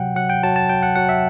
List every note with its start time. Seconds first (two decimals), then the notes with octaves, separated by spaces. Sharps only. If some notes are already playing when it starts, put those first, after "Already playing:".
Already playing: C3 F#3 F#5 G5
0.16 F#3 F#5
0.30 G5
0.43 F#3 A5
0.56 A5
0.69 F#3 G5
0.83 F#5
0.96 F#3 F#5
1.09 E5